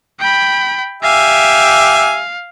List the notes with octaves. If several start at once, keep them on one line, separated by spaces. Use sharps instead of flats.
G5 B5
G4 E5 F5 G#5